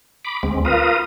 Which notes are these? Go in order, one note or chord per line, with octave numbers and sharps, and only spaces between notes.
B5 D6
D2 G#3 C4
F4 A#4 B4 F5 D#6